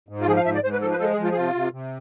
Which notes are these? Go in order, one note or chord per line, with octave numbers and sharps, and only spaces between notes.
G#2
F4
F3 G#4
F5
G#2 E5
D5
G#2 C5
B4
F3 A4
B4
G#3 A4
G#4
F3
F4
G#4
C3 F4
C3
C3